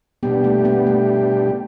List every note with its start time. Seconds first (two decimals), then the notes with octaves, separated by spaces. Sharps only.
0.23 B2 G3 B3 D4 G4
0.44 A3
0.65 B3
0.87 A3